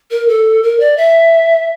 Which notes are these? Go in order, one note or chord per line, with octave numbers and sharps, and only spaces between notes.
A#4
A4
A#4
D5
E5